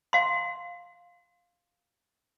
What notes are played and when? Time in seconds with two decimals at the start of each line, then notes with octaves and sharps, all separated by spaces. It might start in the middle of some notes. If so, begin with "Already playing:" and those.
0.13 F5 C6